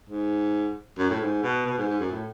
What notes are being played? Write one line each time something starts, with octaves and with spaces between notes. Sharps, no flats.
G#2
F#2
A2
G#2
B2
B2
G#2
G#2
F#2
A2